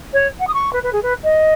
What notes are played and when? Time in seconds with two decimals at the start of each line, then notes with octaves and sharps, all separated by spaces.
0.13 C#5
0.40 F#5
0.47 D#6
0.54 C#6
0.73 B4
0.83 B4
0.93 G#4
1.03 B4
1.23 D#5